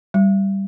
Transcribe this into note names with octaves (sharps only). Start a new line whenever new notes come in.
G3